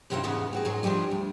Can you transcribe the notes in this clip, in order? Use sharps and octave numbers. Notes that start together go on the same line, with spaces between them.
F#2 C3 E3 C4 D#4 F4
E2 G#2 C#3 E3 B3 D#4
C4 F#4 G#4
G#2 F#3 D#4
E3 F3 G3 A3 D4
D2